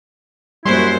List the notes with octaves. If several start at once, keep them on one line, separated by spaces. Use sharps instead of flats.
F#2 G3 A#3 E4 F#4 C5 C6